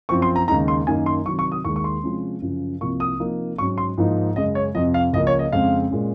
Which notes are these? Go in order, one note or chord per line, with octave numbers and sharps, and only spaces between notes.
F#2 F3 C4 C#6
C6
A#5
D#2 C#3 G#3 D#4 A#5
C6
F#2 D#3 A#3 D#4 G#5
C6
C3 D#3 F#3 C#6
C#6
D#6
D#2 D#3 G#3 C#6
C#6
C6
C3 F3 G#3 C#4
F#2 C#3 F3
C2 C3 F3 A#3 C#6
D#6
C3 F3 A#3 D#4
G#2 F#3 C#4 C#6
C6
G#2 F3 A#3 D#4
F#2 C#3 G#3 D#5
C#5
F2 C3 F3 D#5
F5
C#2 C#3 F3 A#3 D#5
C#5
D#5
F2 C#3 G#3 C4 F5
A#2 G#3 C#4